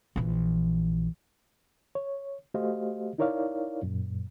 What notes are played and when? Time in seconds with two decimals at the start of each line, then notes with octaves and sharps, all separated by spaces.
0.16 A#1 E3
1.95 C#5
2.54 A3 F#4 G4 C5 D#5 F5
3.18 D#4 E4 A#4 C#5 D5 F5
3.83 F#2 A#2